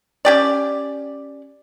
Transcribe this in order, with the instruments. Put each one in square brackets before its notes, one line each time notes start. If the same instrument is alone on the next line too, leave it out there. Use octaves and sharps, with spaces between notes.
[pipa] C#4 G4 D5